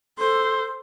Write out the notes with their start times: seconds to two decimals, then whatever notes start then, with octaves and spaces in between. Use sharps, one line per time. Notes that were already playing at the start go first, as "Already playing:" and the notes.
0.19 A4 C5